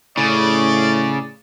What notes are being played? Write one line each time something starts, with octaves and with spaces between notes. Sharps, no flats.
A2 C#3 D5